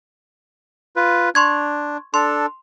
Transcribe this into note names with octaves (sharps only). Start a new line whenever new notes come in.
F4 B4
D4 C6 C#6 G#6
D4 A4 C6